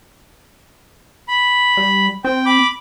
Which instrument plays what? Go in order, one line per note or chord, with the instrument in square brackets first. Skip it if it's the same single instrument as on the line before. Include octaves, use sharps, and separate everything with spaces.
[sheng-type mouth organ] B5
[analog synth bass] G3
[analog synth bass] C4 [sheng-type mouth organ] G5
[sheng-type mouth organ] B5 D6